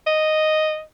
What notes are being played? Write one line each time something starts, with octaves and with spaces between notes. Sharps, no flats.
D#5